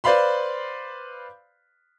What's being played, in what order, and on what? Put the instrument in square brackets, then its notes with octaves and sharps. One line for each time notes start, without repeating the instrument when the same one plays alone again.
[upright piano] B4 C5 D5 F5 B5 C6